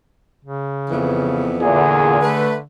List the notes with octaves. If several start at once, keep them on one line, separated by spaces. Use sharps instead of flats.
C#3
F2 E3 B3
E2 A#2 D3 G#4
A3 B4